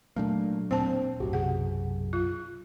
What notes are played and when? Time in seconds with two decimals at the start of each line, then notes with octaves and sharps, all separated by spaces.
0.16 A#2 F#3 A3 A#3 D4
0.71 E1 A#2 C4 C5 A5
1.20 B1 F#2 A2 F#4 G4
1.33 C3 G#4 F#5
2.13 F4 F#6